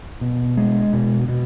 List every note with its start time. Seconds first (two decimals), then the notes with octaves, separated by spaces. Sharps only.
0.21 B2
0.57 G#3
0.93 B2
1.29 B2